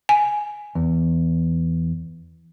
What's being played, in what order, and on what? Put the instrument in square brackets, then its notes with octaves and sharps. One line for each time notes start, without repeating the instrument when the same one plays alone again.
[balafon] G#5
[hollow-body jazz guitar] E2